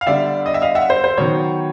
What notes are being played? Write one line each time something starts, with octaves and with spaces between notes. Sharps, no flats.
F5
D3 G3 B3 D5 E5
D#5
E5
D#5 F5
E5 F#5
C5
C5
D#3 F#3 B3 C#5